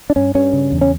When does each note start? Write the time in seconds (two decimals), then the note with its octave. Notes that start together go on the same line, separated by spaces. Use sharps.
0.10 D4
0.16 G2 C#4
0.35 G2 C#4
0.53 C#3
0.72 E2
0.81 C#4